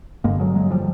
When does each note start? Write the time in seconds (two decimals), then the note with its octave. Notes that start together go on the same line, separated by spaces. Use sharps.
0.24 G2 D3 G#3 A#3
0.40 F#3 G#3
0.55 F#3 G#3
0.70 F3 G3